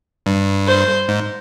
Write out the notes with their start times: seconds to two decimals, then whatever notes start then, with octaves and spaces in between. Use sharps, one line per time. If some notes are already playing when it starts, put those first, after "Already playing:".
0.26 G2
0.67 C5
1.08 G#2